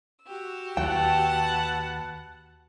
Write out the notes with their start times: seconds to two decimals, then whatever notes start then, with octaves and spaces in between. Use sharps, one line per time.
0.24 F#4 G4 E6
0.77 D#2 B4 F#5 G5 A5